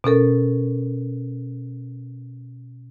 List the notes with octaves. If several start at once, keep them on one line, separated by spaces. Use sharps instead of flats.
B2 C#4 A4 A#4